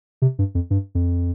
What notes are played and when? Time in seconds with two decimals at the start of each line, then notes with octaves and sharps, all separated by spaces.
0.22 C3
0.39 G2
0.55 F2
0.70 G2
0.95 F2